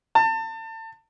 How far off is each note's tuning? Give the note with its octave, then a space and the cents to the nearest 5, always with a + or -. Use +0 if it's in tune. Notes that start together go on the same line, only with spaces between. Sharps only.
A5 +30